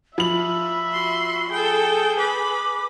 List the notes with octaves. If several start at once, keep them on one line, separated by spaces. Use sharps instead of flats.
F3 E5 B5 F#7
F#4 C6
G#4 A4 G5
B4 B5 D6